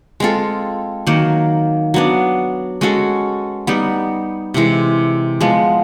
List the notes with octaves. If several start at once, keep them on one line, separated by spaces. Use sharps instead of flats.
G#3 C4 F4 A4
D#3 F#3 A#3
F#3 B3 D4
G#3 C#4 F#4 A4
G3 B3 D#4
C3 E3 G#3
F3 G#3 B3